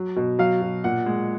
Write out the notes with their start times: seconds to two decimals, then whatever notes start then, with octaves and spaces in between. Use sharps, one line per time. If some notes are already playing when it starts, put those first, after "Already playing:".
Already playing: F#3
0.16 B2
0.39 F#3 F5
0.62 B2
0.84 A#2 F#5
1.06 G#3